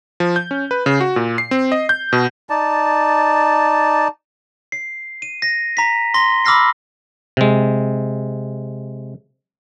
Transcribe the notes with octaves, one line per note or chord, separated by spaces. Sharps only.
F3
G6
C#4
B4
C#3
F#4
A#2
C7
C4
D#5
G6
B2
D#4 D5 A5
C7
D#7
A#6
A#5 B6
C6 A#6 G7
B5 D6 E6 F6 A#6 C7
C3 G#3